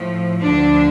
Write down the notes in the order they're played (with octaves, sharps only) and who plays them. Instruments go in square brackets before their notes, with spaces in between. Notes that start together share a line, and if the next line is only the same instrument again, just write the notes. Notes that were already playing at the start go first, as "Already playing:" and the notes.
Already playing: [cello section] A2 F3
D2 D3 F3 D4